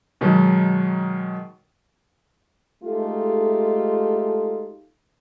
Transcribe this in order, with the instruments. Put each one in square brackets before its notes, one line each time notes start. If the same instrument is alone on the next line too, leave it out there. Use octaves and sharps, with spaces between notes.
[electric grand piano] B2 D#3 F#3 G#3
[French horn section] G#3 A3 D#4 F4 G4 A4